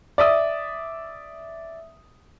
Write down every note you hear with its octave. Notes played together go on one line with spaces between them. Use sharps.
D5 E5 D#6